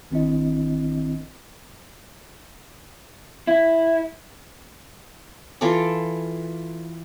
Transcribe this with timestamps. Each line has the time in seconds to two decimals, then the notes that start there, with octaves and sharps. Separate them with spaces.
0.11 A1 D#3 C4 D4 E4 D#5
3.47 E4
5.61 E3 F4 A4 D6